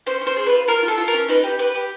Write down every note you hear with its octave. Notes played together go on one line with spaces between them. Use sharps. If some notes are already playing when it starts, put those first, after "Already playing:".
C#4 C5
C#4
C5
G#4
B4
F4
F4 A#4
F4
A4
F4
A#4
C#4
D#4 B4
G4
G4 B4
G4